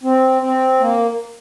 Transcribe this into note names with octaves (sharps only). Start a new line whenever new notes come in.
C4
C4
A#3